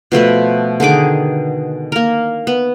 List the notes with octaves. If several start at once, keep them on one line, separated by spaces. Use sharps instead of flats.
B2 F3 A3 B4
D3 D#3 G#4 D6
A#3 A#4
B3